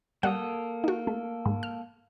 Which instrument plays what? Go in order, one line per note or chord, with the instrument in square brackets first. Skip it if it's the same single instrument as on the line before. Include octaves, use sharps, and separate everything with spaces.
[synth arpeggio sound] G3 F#5 [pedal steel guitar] A#3 A4 D#6
[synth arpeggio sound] D#4 F#4
A3
G#2
F6